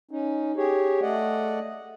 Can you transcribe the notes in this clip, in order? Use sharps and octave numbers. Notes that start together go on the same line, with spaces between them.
C#4 D#4
G4 G#4 C#5
A3 D5 D#5 F#5